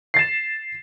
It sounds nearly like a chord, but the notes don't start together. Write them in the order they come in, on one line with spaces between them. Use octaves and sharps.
C7 A6 E7